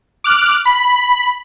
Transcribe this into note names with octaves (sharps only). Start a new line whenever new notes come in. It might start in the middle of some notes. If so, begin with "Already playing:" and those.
D6 F6 F#6
B5